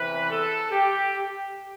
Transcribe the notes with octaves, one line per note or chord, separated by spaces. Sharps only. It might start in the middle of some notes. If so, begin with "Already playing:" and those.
Already playing: E2 C3 E3 B4
A4
G4